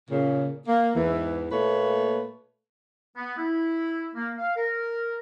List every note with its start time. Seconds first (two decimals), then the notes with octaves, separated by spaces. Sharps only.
0.10 A#2 C#3
0.68 A#3
0.95 E2 G#2 E3
1.51 A#2 A3 A#3 B4 C#5
3.17 B3
3.38 E4
4.15 A#3
4.38 F5
4.56 A#4